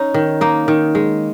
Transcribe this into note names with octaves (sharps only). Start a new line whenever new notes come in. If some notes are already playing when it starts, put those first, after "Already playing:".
Already playing: C#4 D#4
D#3
A#3 D#4
D#3
G#3